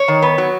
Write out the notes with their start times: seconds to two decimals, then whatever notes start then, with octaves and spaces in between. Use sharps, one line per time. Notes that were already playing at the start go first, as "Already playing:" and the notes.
Already playing: C#5
0.08 D#3
0.22 B3
0.38 F#3